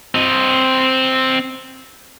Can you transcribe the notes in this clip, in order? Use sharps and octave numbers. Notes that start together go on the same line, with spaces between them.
C4 D#5